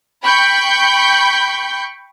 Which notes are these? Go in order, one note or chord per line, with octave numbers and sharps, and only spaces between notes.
G5 B5 C#6 G6